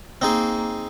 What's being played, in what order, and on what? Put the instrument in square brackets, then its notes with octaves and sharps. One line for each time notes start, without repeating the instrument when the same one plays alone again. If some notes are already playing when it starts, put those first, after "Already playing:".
[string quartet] A#3 [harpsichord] C4 D#4 G#4